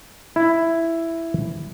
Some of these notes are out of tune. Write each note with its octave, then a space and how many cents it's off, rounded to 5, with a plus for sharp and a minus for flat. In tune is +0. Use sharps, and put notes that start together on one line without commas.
E4 +5